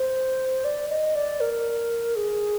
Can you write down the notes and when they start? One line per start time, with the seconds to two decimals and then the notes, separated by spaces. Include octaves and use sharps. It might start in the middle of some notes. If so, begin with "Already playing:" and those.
Already playing: C5
0.64 D5
0.89 D#5
1.15 D5
1.40 A#4
2.16 G#4